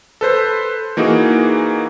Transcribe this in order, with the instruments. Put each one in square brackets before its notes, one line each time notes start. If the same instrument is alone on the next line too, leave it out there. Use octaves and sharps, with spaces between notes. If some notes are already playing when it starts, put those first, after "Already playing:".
[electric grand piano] A4 B4 C5
E3 A#3 D#4 F#4 G#4